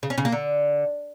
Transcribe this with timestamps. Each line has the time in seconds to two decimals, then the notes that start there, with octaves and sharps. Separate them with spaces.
0.03 C#3
0.10 C#4
0.18 C#3
0.25 A#3
0.32 D3